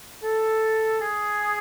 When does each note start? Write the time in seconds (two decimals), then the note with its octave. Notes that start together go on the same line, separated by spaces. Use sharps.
0.23 A4
1.00 G#4